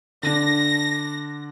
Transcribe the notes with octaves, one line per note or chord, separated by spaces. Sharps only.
D3 D4 A#6